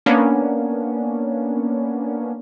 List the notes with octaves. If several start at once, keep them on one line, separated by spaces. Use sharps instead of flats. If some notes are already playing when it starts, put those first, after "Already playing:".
A#3 B3 C#4 D4